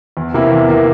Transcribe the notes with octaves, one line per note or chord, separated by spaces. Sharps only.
E2
C3 E3 A#3 E4
E2
C3 E3 A#3 E4